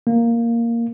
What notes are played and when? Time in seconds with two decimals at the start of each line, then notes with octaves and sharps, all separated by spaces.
0.07 A#3